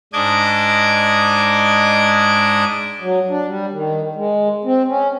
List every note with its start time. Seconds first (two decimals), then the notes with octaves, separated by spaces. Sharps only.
0.13 G#2 D4 D#5 D6 G#6
3.01 F#3
3.29 D4
3.47 G3
3.73 D#3
4.16 G#3
4.65 C4
4.88 C#4